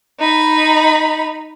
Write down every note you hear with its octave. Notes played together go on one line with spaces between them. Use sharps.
D#4 B5